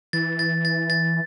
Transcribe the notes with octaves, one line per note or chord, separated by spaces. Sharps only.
E3 A6
A6
A6
A6